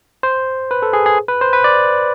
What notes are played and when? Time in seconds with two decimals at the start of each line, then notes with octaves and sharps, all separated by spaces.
0.23 C5
0.71 B4
0.82 A4
0.93 G#4
1.06 G#4
1.28 B4
1.41 C5
1.53 B4
1.64 D5